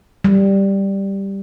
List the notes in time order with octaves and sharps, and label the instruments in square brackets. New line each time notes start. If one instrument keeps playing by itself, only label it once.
[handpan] G3